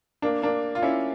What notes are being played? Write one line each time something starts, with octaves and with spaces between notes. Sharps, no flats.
A#3 D4
A#3 D4
F4
C#4 E4